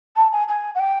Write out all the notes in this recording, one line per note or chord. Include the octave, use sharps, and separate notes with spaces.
A5
G#5
G#5
F#5
G5